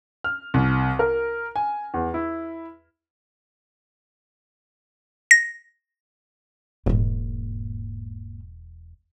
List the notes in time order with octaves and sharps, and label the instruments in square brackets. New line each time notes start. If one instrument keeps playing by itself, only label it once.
[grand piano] F6
C2
A#4
G#5
E2
E4
[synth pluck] A#6
[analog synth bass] E1 [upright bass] G#2 A#3